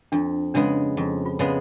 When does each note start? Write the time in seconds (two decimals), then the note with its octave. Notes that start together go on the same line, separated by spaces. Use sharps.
0.12 F2 D4
0.54 C#3 G#3 B3 D4
0.97 F2
1.26 F4
1.39 C#3 G#3 B3